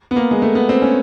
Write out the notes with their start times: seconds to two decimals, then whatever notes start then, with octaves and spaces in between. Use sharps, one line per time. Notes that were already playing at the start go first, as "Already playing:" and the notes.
0.11 B3
0.16 A#3
0.31 G#3
0.42 A3
0.55 B3
0.69 C4
0.82 C#4